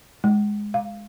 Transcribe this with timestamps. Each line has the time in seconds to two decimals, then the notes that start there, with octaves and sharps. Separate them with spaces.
0.24 G#3
0.74 F5